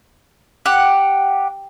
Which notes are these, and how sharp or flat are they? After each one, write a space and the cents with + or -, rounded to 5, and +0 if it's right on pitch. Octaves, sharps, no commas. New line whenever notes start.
G4 +0 F#5 +0